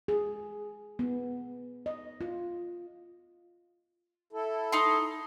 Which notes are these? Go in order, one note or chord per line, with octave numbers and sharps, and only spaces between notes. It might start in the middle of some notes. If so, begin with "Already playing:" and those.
G#4
B3
D#5
F4
E4 A4
D#4 C6